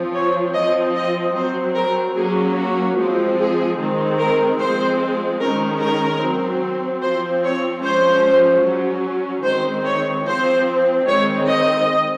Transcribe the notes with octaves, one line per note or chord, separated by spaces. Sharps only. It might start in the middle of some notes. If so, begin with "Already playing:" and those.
Already playing: F3 C4
C#5
F3 D#5
C4
D#5
F#3 C4 C5
A#4
F#3 A#3 C#4 G#4
F#4
F3 G#3 C4
G#4
D#3 G#3 C4
A#4
F3 G#3 C4 C5
D#3 G#3 C#4 A#4
A#4
F#3 C4
F3 C4 C5
C#5
F3 G#3 C#4 C5
F#3 C#4
D#3 G#3 C4 C5
C#5
F3 C4 C5
D#3 G#3 C4 C#5
D#5